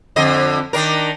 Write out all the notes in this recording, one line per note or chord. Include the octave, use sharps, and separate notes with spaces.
F2 D3 D#5
D#3 D4 A#4